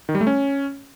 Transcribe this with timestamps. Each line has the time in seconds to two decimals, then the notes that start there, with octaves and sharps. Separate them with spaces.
0.09 D#3
0.15 G3
0.21 A3
0.27 C#4